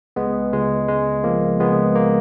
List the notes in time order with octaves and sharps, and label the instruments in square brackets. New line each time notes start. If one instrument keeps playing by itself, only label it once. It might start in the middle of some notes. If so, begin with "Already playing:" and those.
[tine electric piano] C#2 G#3 B3
C#2 G#3
C#3 G#3
F3 A#3
C#2 G#3 B3
A#3